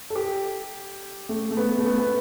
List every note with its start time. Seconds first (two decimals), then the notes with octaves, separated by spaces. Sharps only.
0.10 A4
0.16 G4
1.29 A3
1.51 A3
1.57 B3
1.78 A3
1.86 B3
2.00 B3